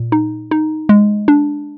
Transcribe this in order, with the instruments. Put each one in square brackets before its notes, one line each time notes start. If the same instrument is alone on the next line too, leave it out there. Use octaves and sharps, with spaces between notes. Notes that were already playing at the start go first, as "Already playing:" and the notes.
Already playing: [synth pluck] A#2
D#4
D#4
G#3
D4